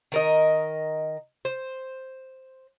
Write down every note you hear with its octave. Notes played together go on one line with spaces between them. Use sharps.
D#3 A#4 D#5
C5